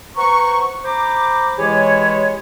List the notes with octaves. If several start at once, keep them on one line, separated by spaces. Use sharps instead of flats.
B4 C5 F#5 A#5 C#6
C5 A#5 B5 D6
E3 G#3 E4 G4 G#4 C#5